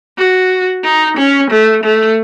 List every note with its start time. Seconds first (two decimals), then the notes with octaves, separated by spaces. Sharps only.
0.18 F#4
0.84 D#4
1.17 C#4
1.50 A3
1.83 A3